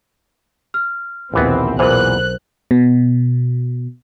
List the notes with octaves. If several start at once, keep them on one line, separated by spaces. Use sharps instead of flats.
F6
A#1 D#2 B2 E3 B3 C4
B1 E2 A#2 E3 A#4 C5 F#6
B2